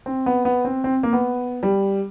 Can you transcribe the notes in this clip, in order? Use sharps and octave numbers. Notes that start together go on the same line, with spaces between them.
C4
B3
B3
C4
C4
A#3
B3
G3